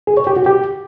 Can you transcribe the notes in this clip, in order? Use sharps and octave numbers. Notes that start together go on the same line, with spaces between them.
G#4
C#5
G4
F#4
G4